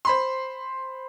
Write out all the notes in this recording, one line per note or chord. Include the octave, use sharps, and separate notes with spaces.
C5 B5 C6